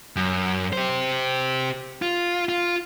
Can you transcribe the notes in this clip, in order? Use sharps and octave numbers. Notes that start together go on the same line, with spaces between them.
F#2
G4 C5
F4
F4